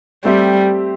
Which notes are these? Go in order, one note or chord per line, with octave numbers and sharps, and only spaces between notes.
G3 A3 C4 G4 C5 E5